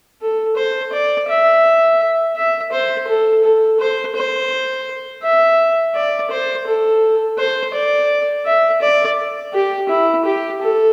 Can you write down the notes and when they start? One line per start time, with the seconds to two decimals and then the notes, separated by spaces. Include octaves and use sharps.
0.21 A4
0.56 C5
0.92 D5
1.28 E5
2.36 E5
2.72 C5
3.07 A4
3.43 A4
3.79 C5
4.15 C5
5.23 E5
5.94 D5
6.30 C5
6.67 A4
7.38 C5
7.73 D5
8.45 E5
8.81 D5
9.53 G4
9.89 E4
10.25 G4
10.61 A4